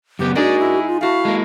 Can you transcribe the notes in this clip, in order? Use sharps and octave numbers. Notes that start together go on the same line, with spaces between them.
F#2 C#3 B3 G4
A#3 D4 D#4 F#4 G#4 A#4 D5
E4
F4
A3 E4 F#4 F5 A5
G#3 A#3